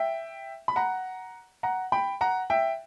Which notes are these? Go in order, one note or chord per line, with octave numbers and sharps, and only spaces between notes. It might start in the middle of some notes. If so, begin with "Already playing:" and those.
Already playing: E5 G5
B5
F#5 A#5
F#5 A#5
G5 B5
F#5 A#5
E5 G5